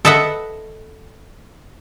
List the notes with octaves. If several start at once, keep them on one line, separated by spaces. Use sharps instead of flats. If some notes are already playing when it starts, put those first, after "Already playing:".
A4 B4 D#5 E5 F#5